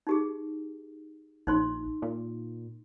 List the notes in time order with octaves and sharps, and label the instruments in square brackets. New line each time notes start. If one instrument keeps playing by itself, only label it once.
[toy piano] D#4 G4 G#4
[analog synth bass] A#1 [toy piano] D#4 C#5 C6
[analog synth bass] A#2